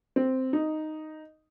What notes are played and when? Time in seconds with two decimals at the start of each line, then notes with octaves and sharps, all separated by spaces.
0.16 C4
0.53 D#4